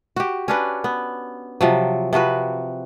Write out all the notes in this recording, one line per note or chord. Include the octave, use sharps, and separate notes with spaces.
F#4 G4
C#4 D4 B4
B3
C3 F3 F#3
C3 F3 F#4 B4